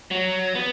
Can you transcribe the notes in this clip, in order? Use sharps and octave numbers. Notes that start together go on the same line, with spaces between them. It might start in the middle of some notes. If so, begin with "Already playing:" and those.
F#3
B3